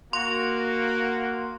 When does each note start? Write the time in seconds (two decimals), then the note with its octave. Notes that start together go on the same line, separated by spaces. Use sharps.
0.13 A#3 F#4 C6